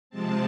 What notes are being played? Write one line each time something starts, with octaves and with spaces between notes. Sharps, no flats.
C3 F3 G#3 C4 A5